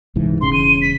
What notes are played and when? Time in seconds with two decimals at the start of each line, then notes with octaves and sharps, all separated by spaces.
0.16 C2 G#2 E3
0.41 E1 C#3 C6
0.53 D#7
0.82 B6